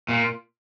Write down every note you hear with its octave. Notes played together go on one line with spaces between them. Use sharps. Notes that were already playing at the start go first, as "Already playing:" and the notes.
A#2